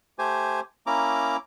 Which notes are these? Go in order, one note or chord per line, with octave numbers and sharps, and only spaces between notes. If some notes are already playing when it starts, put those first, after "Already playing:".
A3 G4 C5 G#5
A#3 C#4 E4 A#5 D6